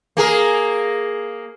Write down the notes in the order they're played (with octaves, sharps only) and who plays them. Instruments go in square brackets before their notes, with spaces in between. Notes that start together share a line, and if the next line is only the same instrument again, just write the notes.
[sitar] A#3 G#4 A#4